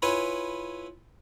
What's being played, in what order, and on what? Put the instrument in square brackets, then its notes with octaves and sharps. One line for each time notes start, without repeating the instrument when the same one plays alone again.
[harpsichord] E4 F4 B4 C#5 G#5